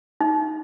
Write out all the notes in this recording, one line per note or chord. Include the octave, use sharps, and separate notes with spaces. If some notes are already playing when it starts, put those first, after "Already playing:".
D#4